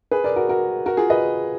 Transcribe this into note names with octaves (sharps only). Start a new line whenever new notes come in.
G#4 B4
A#4 D5
F#4 A#4
F#4 A#4
F#4 A#4
F4 G#4
B4 D#5